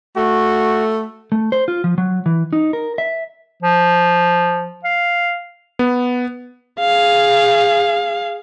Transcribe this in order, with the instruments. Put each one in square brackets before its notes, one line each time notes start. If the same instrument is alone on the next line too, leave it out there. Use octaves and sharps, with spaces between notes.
[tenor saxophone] A3 [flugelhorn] F#4
[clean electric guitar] A3
C5
F4
F3
F#3
E3
D#4
A#4
E5
[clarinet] F3
F5
[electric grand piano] B3
[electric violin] G#4 F5